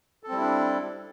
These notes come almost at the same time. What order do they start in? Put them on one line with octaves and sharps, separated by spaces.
A4 C4 G3 E4 D4